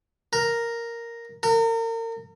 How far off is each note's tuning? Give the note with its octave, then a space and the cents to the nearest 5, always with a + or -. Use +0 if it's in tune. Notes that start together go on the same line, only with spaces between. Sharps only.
A#4 +0
A#4 -35